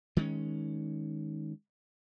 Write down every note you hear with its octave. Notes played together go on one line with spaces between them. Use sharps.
D#3 G#3 C4 C#4